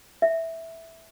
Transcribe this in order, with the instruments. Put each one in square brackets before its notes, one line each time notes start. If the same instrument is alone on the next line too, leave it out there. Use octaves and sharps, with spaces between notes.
[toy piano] E5